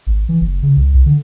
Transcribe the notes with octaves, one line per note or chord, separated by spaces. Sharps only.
G#1
E3
F#1
C#3
C#2
C2
D3